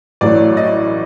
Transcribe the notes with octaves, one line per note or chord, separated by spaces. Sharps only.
A1 A2 F#3 D5
D#5